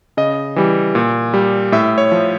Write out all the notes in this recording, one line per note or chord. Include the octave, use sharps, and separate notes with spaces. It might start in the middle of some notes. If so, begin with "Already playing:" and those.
C#3 D#5
E3 G3
A#2
G3
A2 E5
C#5
F3